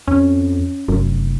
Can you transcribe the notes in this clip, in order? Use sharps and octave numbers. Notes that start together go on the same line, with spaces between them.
F2 C#4
F1 F#2